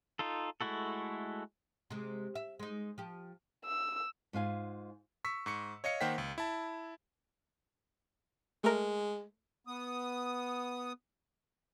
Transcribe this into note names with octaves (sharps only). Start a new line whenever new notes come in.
D#4 F4 A4
G#3 A3 E4 F#4 A4
C3 G#3
E5
G#3 D#4
F3 G4
E6
G#2 F4 F5 G#5
C#6 E6 B6
G#2 C#6 C#7
C#5 D#5 F5 C#7
D#3 A#3 C5 F#5 G5 B6
C#2
E4 A5
G#3 A3 A#4
B3 D#6